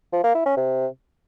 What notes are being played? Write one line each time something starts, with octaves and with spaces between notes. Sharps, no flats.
F3
A#3
E4
C#4
C3